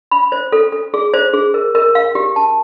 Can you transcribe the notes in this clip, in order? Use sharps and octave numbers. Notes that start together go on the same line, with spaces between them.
B5
C5
A4
A4
G#4
C5
G#4
A#4
A#4
F5
G4
A5